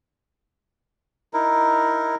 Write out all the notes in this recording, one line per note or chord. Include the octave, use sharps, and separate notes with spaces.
D#4 E4 A#4